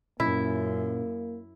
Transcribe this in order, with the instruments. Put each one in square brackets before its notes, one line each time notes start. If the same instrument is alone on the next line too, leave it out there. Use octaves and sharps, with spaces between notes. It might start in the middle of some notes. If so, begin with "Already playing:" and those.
[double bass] F#2 [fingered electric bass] A#2 C#4 [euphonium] A#3 [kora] E4